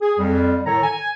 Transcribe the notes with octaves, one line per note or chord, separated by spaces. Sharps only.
G#4
F2 G3
A2 D#3 A4 C#5 A#5
G#5